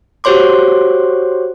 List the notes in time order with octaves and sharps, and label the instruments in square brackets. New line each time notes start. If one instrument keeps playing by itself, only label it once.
[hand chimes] F#4 G4 C5 C#5 C6 D6